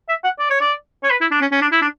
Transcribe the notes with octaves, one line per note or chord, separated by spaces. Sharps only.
E5
F#5
D5
C#5
D5
C#5
B4
E4
D4
C#4
C#4
D4
E4
D4